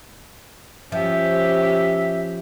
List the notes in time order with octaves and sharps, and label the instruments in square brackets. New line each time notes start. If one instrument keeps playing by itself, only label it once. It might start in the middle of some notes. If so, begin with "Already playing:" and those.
[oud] F3 [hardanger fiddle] C#4 G4 [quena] E5